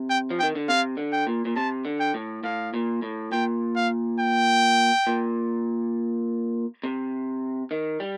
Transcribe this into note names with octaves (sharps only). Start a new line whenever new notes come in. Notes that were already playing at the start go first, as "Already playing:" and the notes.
Already playing: C3
G5
F3
D#3 G5
D3
C3 F5
D3
G5
A#2
A#2
C3 A5
D3
G5
A2
A2 F5
A#2
A2
A#2 G5
F5
G5
A#2
C3
D#3
G3